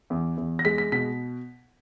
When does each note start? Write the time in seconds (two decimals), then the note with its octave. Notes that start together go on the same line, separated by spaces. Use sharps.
0.10 E2
0.37 E2
0.59 A#6
0.65 G#3 B6
0.78 B6
0.92 B2 B6